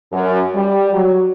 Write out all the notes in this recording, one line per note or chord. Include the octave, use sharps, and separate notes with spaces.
F#2
G3
F#3